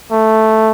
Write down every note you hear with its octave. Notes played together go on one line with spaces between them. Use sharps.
A3